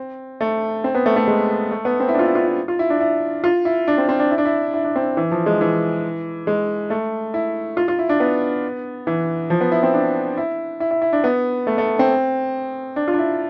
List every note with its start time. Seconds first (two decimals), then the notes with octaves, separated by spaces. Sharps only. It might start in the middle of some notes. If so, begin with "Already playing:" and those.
Already playing: C4
0.41 A3
0.84 C4
0.95 B3
1.06 A3
1.16 A3
1.28 G#3
1.71 A3
1.85 B3
2.00 C4
2.09 E4
2.14 D4 F4
2.25 E4
2.35 F4
2.47 E4
2.68 F4
2.79 E4
2.90 D4
3.00 E4
3.44 F4
3.65 E4
3.88 D4
3.98 C4
4.09 C4
4.19 D4
4.31 E4
4.38 D4
4.45 E4
4.74 E4
4.84 D4
4.96 C4
5.17 E3
5.31 F3
5.46 G#3
5.61 E3
6.47 G#3
6.90 A3
7.34 E4
7.77 F4
7.88 F4
7.99 E4
8.09 D4
8.20 B3
9.07 E3
9.50 F3
9.61 B3
9.72 E4
9.83 C4
9.94 D4
10.37 E4
10.80 E4
10.91 E4
11.02 E4
11.13 D4
11.24 B3
11.67 A3
11.78 A3
11.99 C4
12.96 D4
13.08 F4
13.13 D4
13.18 E4